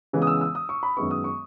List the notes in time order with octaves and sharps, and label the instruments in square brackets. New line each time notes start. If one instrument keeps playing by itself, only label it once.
[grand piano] C#3 E3 G#3 B3
D#6
E6
E6
D#6
C#6
B5
F#2 D#3 G#3 B3 C#6
D#6
C#6